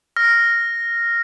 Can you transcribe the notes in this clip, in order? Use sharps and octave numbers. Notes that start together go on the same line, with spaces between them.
F6 A#6